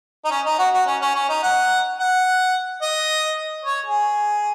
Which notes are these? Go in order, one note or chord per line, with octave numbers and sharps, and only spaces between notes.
D#4
C#4
D#4
F#4
F#4
C#4
C#4
C#4
D#4
F#5
F#5
D#5
C#5
G#4